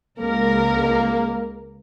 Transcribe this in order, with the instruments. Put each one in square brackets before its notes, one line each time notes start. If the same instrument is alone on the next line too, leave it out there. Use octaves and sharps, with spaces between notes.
[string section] C#2 A#4 [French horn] A#3